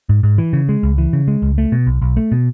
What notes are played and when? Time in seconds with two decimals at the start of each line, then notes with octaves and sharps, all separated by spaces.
0.09 G#2
0.23 G#2
0.38 E3
0.53 C#3
0.69 G#3
0.83 C#2
0.98 E3
1.13 C#3
1.28 G#3
1.42 C#2
1.58 A3
1.72 B2
1.87 B1
2.02 B1
2.17 A3
2.32 B2